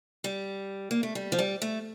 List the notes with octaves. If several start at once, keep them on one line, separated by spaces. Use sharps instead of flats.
G3
A#3
A3
G3
F3
G3
A3